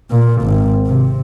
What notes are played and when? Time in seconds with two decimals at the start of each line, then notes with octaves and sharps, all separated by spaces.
0.10 A#2
0.42 G#1
0.86 C3